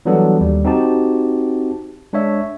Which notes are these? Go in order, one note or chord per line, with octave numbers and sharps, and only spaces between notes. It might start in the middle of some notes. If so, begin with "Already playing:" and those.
E3 F#3 G3 B3 D4 A4
D#2 G3
C4 D#4 F#4 G4 A5
G#3 D4 C#5 E5